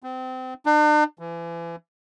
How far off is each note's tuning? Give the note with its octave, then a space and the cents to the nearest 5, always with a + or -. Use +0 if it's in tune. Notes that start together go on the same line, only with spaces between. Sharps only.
C4 -30
D4 +45
E3 +35